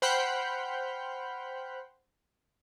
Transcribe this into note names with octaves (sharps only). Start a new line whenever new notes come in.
C5 F#5 G5 B5 F6 G6